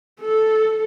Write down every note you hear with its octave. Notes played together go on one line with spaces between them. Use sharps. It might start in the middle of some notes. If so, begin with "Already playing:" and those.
A4